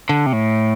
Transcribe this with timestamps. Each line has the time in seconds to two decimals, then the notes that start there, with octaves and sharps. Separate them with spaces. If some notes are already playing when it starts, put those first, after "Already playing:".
0.09 D3
0.26 C3
0.33 A2